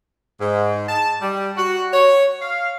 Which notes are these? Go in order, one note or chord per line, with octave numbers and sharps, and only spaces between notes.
G#2
A5
G3
F#4
C#5
F5